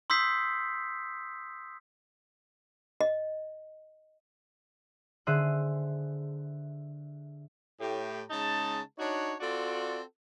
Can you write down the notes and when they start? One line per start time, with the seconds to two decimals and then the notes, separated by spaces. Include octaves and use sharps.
0.10 C6 D#6 E6 G6 B6 C7
3.01 D#5
5.27 D3 G#4 C5 E5 F#6 D#7
7.80 A2 G4
8.30 C#3 G#3 D#4 A5
8.98 D4 D#4 F#4 C#5
9.41 C4 F4 F#4 A4 D5